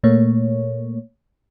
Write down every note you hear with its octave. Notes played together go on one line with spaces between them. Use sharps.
A#2 A3 A#3 C#5